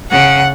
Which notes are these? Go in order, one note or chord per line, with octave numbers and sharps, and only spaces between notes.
C#3 F#5